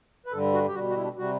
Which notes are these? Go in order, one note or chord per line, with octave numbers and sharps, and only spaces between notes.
B4
G2 D3 G3 A4
F#4
G4
B2 G3 F#4
F#4
E4
D4
C3 G3 F#4